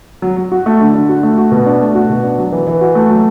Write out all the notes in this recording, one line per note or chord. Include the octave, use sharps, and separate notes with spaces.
F#3
F#3
F#4
A3
D3
D3
F#4
A3
F#4
B2
D4
A3
F#4
B2
D4
F#3
E3
E3
F#4
A3
F#3